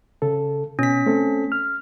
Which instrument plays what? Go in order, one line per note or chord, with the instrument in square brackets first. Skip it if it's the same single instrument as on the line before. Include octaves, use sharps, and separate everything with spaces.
[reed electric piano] C#3 A4
[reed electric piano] B2 [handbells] C#4 B6
[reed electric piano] A3 C4 A4
F6